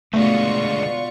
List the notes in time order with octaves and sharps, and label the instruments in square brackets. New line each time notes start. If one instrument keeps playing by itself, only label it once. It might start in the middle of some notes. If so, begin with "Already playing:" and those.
[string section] B2 F4 C#6 [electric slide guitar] D3 G#3 B3 [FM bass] A3 [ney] D5